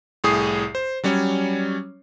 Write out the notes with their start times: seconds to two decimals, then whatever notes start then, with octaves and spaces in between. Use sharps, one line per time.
0.24 C2 A2 G#4 D#6 C7
0.75 C5
1.04 F#3 G3 C#4 C#5